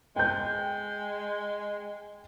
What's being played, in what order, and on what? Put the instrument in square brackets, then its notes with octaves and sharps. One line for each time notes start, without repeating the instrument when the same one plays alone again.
[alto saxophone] G#3 [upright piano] G5 G6